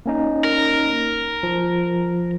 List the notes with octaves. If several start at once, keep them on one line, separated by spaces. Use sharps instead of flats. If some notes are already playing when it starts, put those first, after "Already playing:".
A#3 C#4 D#4
A#4
F3